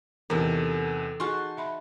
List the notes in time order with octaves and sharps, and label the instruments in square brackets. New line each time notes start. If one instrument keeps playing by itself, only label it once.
[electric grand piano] E2 C3 D#4 [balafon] E3 [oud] A4 A#4
[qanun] D#4 F#4 A5 [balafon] G#4 G#5 C#6 [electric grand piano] C6
[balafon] E5 B5 C6